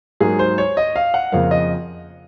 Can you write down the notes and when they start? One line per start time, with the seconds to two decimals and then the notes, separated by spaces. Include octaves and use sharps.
0.20 G#2 F#3 A#3 G#4
0.39 C5
0.58 C#5
0.77 D#5
0.96 F5
1.14 F#5
1.32 F2 C#3 F3 A#3 F5
1.51 D#5